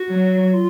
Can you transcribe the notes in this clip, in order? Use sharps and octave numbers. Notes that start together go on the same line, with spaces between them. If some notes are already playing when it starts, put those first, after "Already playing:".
Already playing: F#4
F#3
F4